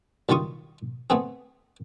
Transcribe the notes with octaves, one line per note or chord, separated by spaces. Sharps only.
B1 D#3 G3 F4 C#6 D#6
A3 B3 C4 G#4